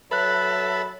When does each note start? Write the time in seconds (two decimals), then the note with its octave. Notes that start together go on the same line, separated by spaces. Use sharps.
0.11 F#3 A4 B4 E5 B5 F#6